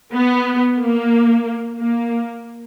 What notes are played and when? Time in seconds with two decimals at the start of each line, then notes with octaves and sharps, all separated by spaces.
0.11 B3
0.78 A#3
1.78 A#3